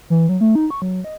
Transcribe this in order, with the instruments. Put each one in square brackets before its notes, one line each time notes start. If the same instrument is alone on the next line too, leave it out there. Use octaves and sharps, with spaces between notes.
[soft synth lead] E3
F#3
A3
D#4
C#6
F#3
D#5